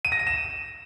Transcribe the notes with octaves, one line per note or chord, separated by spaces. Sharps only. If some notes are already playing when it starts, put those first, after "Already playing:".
D#7
A#6
D#7
E7